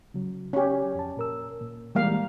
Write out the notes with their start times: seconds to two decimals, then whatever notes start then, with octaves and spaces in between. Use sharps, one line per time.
0.14 C#3 F#3
0.53 C#4 G4
0.95 F2 A5
1.17 A#2 A#4 E6
1.61 A#2
1.95 E3 G3 G#3 A#3 F5